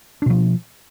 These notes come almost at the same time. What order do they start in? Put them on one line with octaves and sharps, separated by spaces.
D4 B2 F3